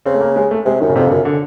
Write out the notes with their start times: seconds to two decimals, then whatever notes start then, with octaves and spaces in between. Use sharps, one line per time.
0.06 C#3 C4
0.14 A3
0.21 A#3
0.36 G#3
0.51 A3
0.65 C3 G#3
0.80 F#2 D#3
0.90 C#3
0.95 F2 C3
1.06 D3
1.11 F#2 C#3
1.25 D3